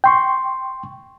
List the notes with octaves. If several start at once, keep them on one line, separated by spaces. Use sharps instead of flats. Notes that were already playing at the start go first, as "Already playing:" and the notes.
G5 C6 C#6